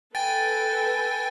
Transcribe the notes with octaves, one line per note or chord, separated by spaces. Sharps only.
A4 B4 G5 G#5 A6